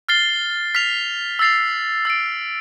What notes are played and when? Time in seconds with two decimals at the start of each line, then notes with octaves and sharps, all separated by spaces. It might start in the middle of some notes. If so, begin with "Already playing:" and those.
0.09 F6 A6 C7 G7
0.75 F6 B6 F7
1.39 E6 A6 C7 F7
2.05 E6 A6 D7